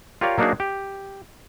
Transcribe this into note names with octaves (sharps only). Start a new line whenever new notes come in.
F4 G4 A#4 C#5 D5 F5
F#3 A#3 D4 D#4 F#4 G#4
G4